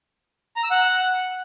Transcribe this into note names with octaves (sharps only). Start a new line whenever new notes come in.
A#5
E6
F#5